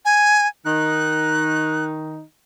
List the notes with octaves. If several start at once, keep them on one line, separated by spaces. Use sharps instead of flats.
G#5
D#3 D#4 F#6